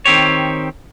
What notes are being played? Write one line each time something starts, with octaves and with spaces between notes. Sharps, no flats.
D#3 C4 G4 C#5